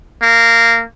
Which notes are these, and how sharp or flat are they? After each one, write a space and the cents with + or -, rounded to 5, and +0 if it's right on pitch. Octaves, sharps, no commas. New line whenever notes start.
A#3 -15